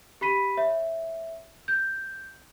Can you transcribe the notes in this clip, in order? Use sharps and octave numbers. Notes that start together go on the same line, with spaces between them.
G4 B5 B6 D#7
C#5 E5
G6